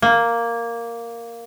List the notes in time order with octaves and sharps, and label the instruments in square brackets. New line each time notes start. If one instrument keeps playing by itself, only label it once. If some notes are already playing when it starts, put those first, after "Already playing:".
[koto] A#3